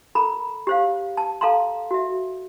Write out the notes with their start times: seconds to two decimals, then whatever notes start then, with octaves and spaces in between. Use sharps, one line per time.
0.15 A4 A#4 A#5 B5
0.67 G4 C5 F5
1.17 A5
1.41 A4 F5 A5 A#5 C6
1.91 F#4 E5